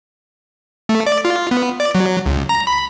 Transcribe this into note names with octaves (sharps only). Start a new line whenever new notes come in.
A3
D5
F4
B3
D5
F#3
C#2
A#5
B5